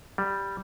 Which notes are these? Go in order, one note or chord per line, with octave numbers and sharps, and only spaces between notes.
G3